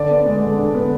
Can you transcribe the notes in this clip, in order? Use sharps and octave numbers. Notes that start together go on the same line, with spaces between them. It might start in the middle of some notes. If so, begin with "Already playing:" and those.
Already playing: D3 D5
B3
G#3
D3
D3
B3